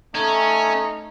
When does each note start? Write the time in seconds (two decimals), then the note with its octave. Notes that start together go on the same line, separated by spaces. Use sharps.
0.15 A3 C#4 D#4